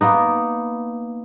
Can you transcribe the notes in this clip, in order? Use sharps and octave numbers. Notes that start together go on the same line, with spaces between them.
A#3 B3 D#4